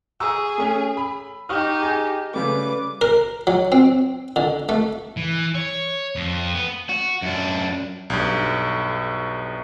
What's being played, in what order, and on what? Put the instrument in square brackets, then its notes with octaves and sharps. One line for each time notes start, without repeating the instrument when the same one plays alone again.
[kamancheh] G#4 [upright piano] A#5 C#6 E6
[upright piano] A3 C#4
B5
[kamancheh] D#4 G4 [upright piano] C#6 F6
[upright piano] G#4 G#5
[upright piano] C#3 G3 A3 [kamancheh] B4 D6
[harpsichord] A#4
F#3
C4
D3
A3
[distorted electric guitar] E3
C#5
F2
B3
[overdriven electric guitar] F#4
F#2 D4
[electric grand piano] B1 G2